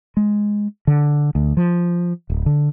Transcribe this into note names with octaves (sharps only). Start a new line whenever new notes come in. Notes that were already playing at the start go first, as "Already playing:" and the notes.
G#3
D3
D2
F3
D1
D3